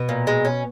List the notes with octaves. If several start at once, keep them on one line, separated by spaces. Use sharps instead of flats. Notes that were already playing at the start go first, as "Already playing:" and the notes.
Already playing: B2 B3
A#2
G#3
C#4